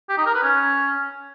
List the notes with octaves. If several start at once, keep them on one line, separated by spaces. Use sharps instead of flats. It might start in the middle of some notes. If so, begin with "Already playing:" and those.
G4
D#4
A#4
B4
C#4